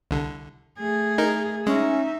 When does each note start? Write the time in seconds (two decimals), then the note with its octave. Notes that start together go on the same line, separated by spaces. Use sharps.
0.11 C2 D3
0.79 A3 G#4
1.18 D#4 A#4
1.67 G#3 C#4 D#4 E5